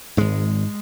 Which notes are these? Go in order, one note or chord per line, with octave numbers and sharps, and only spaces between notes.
G#1 G#2 G#3